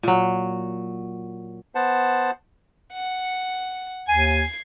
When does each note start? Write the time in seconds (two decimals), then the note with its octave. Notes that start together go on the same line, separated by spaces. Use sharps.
0.03 A#2 F#3
1.75 B3 C5 F#5 A5
2.93 F#5
4.09 D#2 G#5 G#6 C7